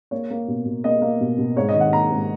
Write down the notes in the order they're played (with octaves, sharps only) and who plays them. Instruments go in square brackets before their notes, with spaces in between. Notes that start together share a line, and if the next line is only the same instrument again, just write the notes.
[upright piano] A#3 C#5
A#3
B2
B2
A#3 D#5
A#3
B2
B2
G#2 C#5
D#5
D#3
F#5
A#3 A#5
G#2